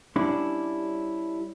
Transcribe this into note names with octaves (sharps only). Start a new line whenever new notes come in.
G3 C#4 D4 E4